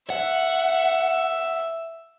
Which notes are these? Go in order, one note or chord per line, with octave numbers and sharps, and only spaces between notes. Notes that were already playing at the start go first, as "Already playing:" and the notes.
E5 F#5